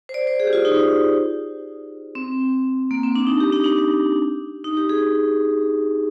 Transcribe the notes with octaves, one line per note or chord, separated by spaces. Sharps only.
C5
D5
C5
G#4
G4
F4
D#4
C4
A#3
C4
D4
D#4
G4
D#4
D4
D#4
G4
G#4